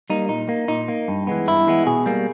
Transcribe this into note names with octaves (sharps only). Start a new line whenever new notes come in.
G3 A#3 D#4
A#2 D#4
A#3
A#2 D#4
A#3
G2
E3 G#3 B3
G2 E4
E3 G#3 B3
B2 G#4
G3 A#3